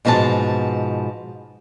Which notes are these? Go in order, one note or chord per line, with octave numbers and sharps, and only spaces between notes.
G#2 B2 F3 G#3 A5